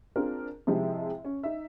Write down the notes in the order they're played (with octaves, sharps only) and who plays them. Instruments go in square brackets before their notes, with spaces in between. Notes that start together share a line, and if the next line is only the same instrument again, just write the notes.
[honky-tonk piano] C4 D4 F4 G#4 A#4
C3 F3 G#3 E4 G4 G#4
C#4
D#4 E5